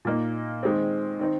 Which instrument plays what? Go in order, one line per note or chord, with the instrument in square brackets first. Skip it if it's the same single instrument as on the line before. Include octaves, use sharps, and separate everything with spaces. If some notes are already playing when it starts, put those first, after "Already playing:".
[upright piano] A#2 A#3 D#4
D#3 G#3 C4
D#3 C4 D#4